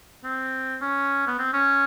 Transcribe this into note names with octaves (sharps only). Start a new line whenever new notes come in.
C4
C#4
B3
C4
C#4